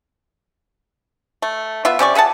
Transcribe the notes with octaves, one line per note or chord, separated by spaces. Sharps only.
A3
B3 F4 E5
C3 C#4 D5 C#6
G#4 E5 F#5 A5